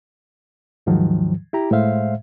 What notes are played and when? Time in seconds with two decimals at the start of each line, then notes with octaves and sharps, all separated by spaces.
0.87 D#2 G#2 D#3 F3 F#3
1.53 E4 G4 A#5
1.71 A2 G#3 C5 E5 F5